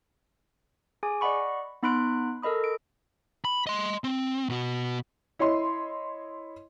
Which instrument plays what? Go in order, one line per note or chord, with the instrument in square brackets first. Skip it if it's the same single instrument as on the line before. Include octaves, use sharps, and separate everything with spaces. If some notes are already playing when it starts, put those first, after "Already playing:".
[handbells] G#4 G#5 D6
D5 D#5 F#5 B5 C#6
B3 D#4 B5 C6 F#6 D7
A4 A#4 D#5 B5 D#6
D7
[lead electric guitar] B5
D#5 C6
C4
B2 F#4
[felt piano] E4 C#5 D#5 C6